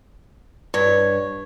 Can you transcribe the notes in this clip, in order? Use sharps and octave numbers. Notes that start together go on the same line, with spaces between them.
G2 C#5